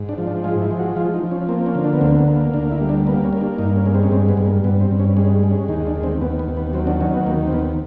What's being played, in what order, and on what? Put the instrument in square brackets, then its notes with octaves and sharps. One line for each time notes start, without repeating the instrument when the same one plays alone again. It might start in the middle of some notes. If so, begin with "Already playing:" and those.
Already playing: [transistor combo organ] G#2
D4
F3
D4
G#3 F4
E4
F3
F#4
F3 F4
D#4
F3
C#4
A#3 C4
C#4
D3
D4
B3
D2 C4
B3
A#3
B3
D2 D4
E4
G3
D4
A#3 B3
C#4
A#3
D4
G2 D#4
C#4
G#3
C4
C#4
G2 C4
B3
G2
A#3
G2 B3
C4
G2
C#4
G#3 C#4
G#3
C#4
D#2 D#4
D4
D#2
C4
D#2 B3
B3
D#2
B3
F#3 C4
D4
D#3 C#4
B3
D#2 A#3
C4
D#2 B3